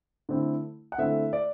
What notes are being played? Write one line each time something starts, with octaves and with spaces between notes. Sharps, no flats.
D3 A3 C4 E4
F#5
D3 A3 C4 E4 E5
D5